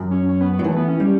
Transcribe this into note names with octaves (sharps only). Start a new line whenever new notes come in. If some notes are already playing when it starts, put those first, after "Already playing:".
Already playing: F#2
C#4
C#4
B3
B3
F#3
E3 A3
B3
C#4
G3